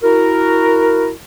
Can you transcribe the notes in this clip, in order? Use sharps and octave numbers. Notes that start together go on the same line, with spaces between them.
E4 F#4 A#4